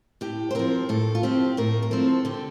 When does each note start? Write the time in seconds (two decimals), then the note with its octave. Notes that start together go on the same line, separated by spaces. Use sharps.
0.21 A2 G4
0.51 C5
0.55 F3 C4 A#4
0.89 A2 A4
1.15 F4
1.23 F3 C4 G4
1.57 A2 A#4
1.82 A#4
1.91 F3 C4 A4
2.25 D3 G4